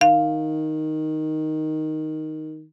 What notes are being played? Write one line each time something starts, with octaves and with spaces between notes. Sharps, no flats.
D#3 F5